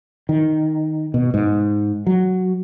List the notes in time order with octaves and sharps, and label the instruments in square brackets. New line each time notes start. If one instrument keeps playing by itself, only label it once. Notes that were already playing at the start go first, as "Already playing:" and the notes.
[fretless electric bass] D#3
B2
G#2
F#3